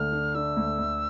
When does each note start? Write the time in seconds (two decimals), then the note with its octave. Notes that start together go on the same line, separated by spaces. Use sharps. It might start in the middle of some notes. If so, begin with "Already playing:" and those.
Already playing: D2 D3 D4 F6
0.12 D4
0.35 D4 E6
0.56 D2
0.78 D2